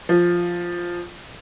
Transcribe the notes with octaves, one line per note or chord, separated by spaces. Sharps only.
F3